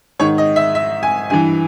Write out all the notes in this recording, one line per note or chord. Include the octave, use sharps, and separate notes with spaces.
G#2 D#3 C#5
D#5
E5
E5
G#5
G2 E3 G#5